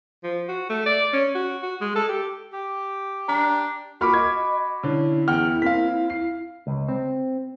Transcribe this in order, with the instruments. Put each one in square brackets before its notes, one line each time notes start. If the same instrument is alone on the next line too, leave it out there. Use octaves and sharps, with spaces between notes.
[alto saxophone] F3
F#4
A3
D5
C#4
F#4
F#4
G#3
A4
G4
[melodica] G4
[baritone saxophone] D4 [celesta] A#5
[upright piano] A#3 C#6 F6 [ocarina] F4 [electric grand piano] F#4 B5 D6
[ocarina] D#5 [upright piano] G#6
[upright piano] D3 C#4 [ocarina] E4
[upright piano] E2 F#5 G5 [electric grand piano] F6
[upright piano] A#3 C4 [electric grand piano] F5 B6
[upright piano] C7
[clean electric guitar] C#2
C4